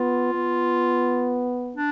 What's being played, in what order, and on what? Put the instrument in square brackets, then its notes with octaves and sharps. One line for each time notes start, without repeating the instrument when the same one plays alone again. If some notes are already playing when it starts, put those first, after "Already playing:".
Already playing: [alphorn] B3 [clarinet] F4
[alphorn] B3
[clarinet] D4